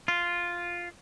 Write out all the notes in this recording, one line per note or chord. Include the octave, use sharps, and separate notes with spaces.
F4